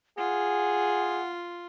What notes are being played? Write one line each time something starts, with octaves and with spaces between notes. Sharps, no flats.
F4 G#4 F#5